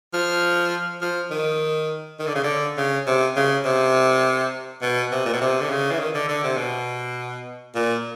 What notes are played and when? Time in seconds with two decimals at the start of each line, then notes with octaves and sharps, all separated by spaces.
0.14 F3
1.02 F3
1.31 D#3
2.19 D#3
2.27 D3
2.35 C#3
2.44 D3
2.77 C#3
3.07 C3
3.37 C#3
3.65 C3
4.82 B2
5.12 C3
5.26 A#2
5.33 B2
5.41 C3
5.61 D3
5.70 C#3
5.92 E3
5.99 D#3
6.14 D3
6.29 D3
6.44 C3
6.57 B2
7.75 A#2